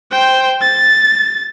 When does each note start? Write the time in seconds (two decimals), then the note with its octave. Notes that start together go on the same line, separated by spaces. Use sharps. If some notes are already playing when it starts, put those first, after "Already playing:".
0.12 C5 G5
0.61 A6